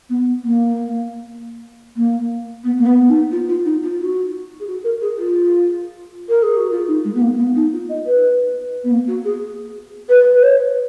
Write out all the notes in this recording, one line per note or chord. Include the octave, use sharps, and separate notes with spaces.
B3
A#3
A#3
B3
A#3
B3
D#4
F4
F4
D#4
F4
F#4
G#4
F#4
A#4
G#4
F4
A#4
G#4
F#4
F4
D#4
G#3
B3
A#3
B3
D#4
F4
D#5
B4
B3
A#3
F#4
G#4
B4
B4
C#5